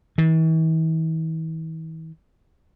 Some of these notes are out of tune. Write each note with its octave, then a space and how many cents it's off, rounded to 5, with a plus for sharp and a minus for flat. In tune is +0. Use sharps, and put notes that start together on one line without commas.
E3 -45